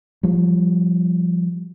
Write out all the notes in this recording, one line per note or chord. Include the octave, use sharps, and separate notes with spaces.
F3 G3